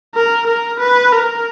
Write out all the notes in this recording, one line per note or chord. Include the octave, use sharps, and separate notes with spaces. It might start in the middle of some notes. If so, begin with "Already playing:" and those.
A#4
A#4
B4
A#4